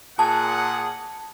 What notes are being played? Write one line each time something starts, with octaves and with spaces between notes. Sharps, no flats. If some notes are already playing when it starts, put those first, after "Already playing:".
A#2 G#4 F#5 A5